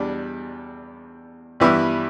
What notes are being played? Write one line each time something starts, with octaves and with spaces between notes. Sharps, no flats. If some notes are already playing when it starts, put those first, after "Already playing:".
Already playing: E2 B2 G3 D4
G2 E3 G3 B3 E4